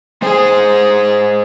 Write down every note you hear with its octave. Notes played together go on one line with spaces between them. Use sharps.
G#3 G#4 C5